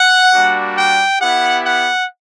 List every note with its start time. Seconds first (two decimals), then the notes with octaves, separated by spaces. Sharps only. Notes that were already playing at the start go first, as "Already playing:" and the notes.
Already playing: F#5
0.33 G3 A#3 D4 F#4
0.77 G5
1.20 B3 E4 G4 F#5
1.64 F#5